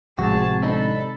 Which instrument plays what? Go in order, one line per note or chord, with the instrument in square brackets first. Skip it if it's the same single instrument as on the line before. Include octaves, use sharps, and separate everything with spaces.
[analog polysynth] G#1 C3 [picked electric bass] A2 F3 G#3 [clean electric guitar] F#4 [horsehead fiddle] G#4 A5
[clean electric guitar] C4 D4 D#4 [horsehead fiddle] A4 B5